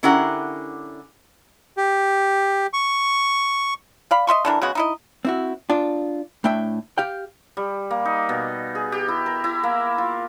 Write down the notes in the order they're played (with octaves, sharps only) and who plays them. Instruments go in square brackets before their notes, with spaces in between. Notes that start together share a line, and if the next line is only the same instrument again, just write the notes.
[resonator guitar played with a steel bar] D3 C#4 E4 G4 A#4 F#5
[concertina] G4
C#6
[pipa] D5 F5 B5
D#5 E5 C6 C#6
D3 E3 D4 A#4
C#3 G#3 B3 F#4
D#4 E4 D#5
[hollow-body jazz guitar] C4 E4 F#4
D4 F4
A2 A3 D4 E5 G5
G4 F5 G5
[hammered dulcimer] G3
A#3
D#4
B2
G#4
G4
E4
A#4
E4
A#3
F4